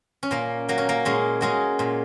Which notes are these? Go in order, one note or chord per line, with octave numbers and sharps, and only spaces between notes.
C#4
A#2 A#3
F#3 A#3
C#4
A#3
A#2 G#3 C#4
F#3 G#3 C#4
A#2